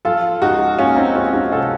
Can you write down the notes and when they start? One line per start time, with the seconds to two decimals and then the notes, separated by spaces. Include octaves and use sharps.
0.05 F3 F4 A4
0.41 C#2 D#4 F#4
0.79 A#3 C#4 F4
0.97 C4 D#4
1.15 C#2 C#4 F4
1.33 D#4 F#4
1.52 C3 F4 A4